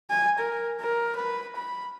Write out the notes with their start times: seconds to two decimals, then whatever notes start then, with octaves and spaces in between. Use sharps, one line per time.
0.10 G#5
0.39 A#4
0.81 A#4
1.16 B4
1.56 B5